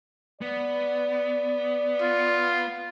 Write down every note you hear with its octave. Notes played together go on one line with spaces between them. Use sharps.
B3 D5
F4